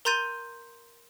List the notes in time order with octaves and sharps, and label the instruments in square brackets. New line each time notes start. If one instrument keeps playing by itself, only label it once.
[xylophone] A#4 A#5 C6 G6 A6 D#7